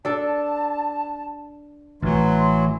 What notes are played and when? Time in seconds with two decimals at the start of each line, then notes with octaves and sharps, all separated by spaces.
0.05 D4 A4 A5
2.02 A1 A2 E3 F#3 C6